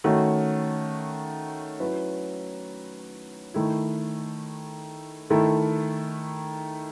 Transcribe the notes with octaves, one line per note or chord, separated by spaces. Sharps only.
D#3 A3 C#4 F#4
F#3 C#4 E4 B4
D#3 A3 E4
D#3 A3 E4 A4